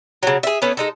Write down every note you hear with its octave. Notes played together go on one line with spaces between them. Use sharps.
C#3 F#3
G#4 E5
A3 B3 C#4
G#3 D#4 A4